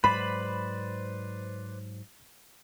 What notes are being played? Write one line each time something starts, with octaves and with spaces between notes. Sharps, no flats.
G#2 F#3 B4 C5 D5 B5